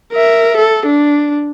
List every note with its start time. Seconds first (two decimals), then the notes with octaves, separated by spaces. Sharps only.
0.13 A#4 E5
0.56 A4
0.86 D4